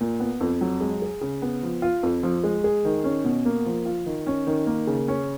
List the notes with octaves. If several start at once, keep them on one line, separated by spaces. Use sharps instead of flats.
A#2
B3
F2
F#3
G#3
G#4
C#3
B3
F3
F4
F2
F3
G#3
G#4
D#3
C#4
B2
A#3
F3
F4
D#3
C#4
D#3
A#3
C#3
C#4